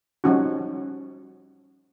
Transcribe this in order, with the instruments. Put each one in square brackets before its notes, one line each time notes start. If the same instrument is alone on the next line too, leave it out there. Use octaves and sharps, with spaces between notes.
[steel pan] F3 G3 C#4 D#4 F#4